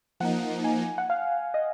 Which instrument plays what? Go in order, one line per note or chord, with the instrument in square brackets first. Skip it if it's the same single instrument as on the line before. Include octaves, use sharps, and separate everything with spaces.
[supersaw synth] F3 A#3 D#4 [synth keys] F#5
[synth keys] G#5
F#5
F5
D#5